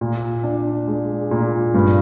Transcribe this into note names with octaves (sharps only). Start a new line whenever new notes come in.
A#2
D4
G#3
A#2
G2